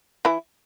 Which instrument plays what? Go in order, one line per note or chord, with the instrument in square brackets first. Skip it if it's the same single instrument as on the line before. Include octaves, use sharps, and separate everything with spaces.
[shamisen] E3 E4